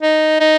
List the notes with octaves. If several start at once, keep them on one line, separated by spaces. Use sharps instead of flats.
D#4
D#4